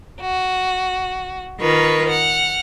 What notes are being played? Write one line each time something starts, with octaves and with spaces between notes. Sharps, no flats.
F#4
D#3 F4 A#4 B4 C#6
F#5 F6